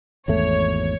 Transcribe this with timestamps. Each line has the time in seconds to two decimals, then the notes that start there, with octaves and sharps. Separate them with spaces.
0.28 G#1 E2 A3 C#5